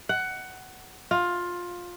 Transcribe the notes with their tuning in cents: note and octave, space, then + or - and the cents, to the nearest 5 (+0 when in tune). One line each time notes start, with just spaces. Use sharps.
F#5 +15
F4 +15